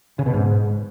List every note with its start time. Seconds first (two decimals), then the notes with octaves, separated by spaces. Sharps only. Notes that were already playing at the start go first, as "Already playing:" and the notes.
0.19 C#3
0.26 B2
0.33 G#2